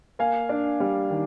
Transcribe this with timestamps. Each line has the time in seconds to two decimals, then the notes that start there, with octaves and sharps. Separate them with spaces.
0.19 A#3 F5 G#5
0.49 D4
0.80 G3
1.10 D#3